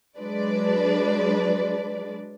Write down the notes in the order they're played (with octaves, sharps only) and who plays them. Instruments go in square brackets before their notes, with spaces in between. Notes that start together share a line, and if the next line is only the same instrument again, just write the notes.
[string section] F#3 G#3 D4 B4 D5